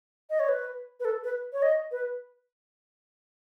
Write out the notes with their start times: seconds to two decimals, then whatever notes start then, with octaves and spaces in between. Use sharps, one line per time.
0.30 D#5
0.39 C#5
0.48 B4
1.00 B4
1.05 A4
1.24 B4
1.53 C#5
1.62 D#5
1.91 B4